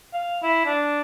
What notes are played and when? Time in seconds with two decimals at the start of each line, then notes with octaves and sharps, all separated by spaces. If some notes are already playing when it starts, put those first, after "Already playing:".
0.13 F5
0.43 E4
0.65 D4